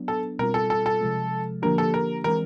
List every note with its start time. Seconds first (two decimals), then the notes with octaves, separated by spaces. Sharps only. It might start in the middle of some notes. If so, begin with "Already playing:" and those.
Already playing: F#3 B3 D4
0.08 A4
0.39 B2 G3 C4 F4 A#4
0.54 A4
0.70 A4
0.86 A4
1.01 C3 F3 G#3
1.62 D3 F3 A#3 D4 G4 A#4
1.78 A4
1.94 A#4
2.24 E3 G#3 C4 A#4